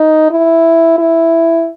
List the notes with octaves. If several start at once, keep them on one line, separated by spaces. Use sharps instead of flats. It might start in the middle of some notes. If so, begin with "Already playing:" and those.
Already playing: D#4
E4
E4